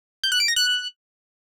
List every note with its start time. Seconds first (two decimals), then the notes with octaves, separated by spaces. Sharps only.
0.24 G6
0.32 F#6
0.40 D7
0.48 A#6
0.56 F#6